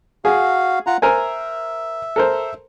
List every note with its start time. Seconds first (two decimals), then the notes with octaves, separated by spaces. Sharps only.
0.25 F#4 G#4 F5
0.87 F4 F#5 A#5
1.02 A#4 C5 E5 G#5
2.16 A4 A#4 C5